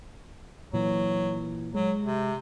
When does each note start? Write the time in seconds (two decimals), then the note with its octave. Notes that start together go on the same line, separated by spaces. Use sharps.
0.73 A#2 E3 F#3
1.74 F#3 G#3
2.03 C3